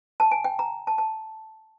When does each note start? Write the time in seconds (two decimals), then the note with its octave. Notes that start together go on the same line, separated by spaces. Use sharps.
0.20 A5
0.31 G#5
0.44 G5
0.59 A#5
0.87 A5
0.98 A5